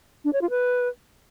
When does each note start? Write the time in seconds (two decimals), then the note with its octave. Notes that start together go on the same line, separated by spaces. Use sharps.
0.25 D4
0.33 C#5
0.42 F4
0.50 B4